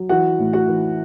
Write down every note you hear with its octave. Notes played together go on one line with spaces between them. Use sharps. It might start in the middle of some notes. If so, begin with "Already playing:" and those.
Already playing: F#3
E3 F#4 F#5
A2
F#4 F#5
E3